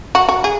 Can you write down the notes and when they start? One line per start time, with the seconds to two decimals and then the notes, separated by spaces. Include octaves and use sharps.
0.15 F#4
0.29 F#4
0.44 G#4